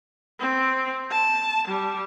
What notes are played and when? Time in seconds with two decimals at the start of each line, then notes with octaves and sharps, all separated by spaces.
0.40 C4
1.11 A5
1.68 G3